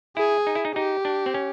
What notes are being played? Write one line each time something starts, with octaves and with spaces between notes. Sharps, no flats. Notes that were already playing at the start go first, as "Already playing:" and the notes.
E4 G#4
D#4
E4
D#4
D#4 G4
D4
C4
C#4